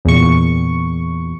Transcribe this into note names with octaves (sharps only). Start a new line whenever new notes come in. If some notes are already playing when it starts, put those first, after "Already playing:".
E2 A#2 C#6